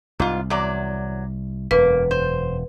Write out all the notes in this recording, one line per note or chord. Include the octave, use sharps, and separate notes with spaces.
C2 G#2 F4
E2 F#3 D5
E1 F#2 A#3 B4
C5